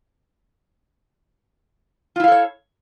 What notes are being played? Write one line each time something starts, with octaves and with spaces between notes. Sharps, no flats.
E4 F4 A4 C#5 F5